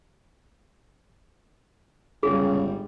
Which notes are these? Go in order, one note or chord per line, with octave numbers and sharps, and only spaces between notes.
G1 A2 C#3 G3 G#3 G#4